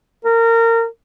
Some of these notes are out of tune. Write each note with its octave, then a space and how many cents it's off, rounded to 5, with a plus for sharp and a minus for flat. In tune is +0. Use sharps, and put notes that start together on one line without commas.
A#4 -25